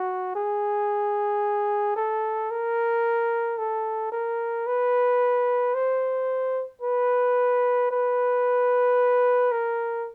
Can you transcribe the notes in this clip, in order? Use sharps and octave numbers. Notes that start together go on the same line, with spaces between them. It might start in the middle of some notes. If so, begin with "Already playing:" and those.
Already playing: F#4
G#4
A4
A#4
A4
A#4
B4
C5
B4
B4
A#4